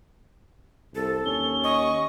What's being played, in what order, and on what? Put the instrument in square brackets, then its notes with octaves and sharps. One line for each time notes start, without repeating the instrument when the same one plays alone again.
[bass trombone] C2 [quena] A4
[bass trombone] D#2 [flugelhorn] C#4 [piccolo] G7
[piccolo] D#5 [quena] C#6